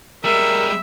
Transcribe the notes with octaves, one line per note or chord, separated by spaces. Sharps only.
G3 G#3 A#4 E5